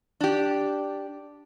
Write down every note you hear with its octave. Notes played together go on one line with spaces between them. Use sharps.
D4 G4